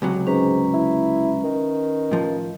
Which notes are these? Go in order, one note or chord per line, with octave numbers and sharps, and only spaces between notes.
C#2 C3 F#3
G#2 C#4 B4 A#5
E4
D#3
A2 F3